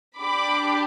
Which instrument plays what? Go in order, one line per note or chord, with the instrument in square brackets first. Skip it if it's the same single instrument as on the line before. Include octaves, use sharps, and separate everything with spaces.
[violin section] D4 G4 B5 D6